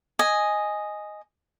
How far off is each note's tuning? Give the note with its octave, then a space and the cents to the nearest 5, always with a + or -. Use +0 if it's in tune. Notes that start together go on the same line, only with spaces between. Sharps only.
D#5 +0 G#5 +0